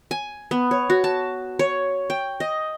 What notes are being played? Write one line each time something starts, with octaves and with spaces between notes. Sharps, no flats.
G#5
B3
C#5
F#4
A5
C#5
G5
D#5